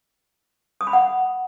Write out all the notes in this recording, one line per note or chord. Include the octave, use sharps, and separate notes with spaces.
D#6
B5
F#5